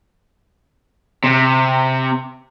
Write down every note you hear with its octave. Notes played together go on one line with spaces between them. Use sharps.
C3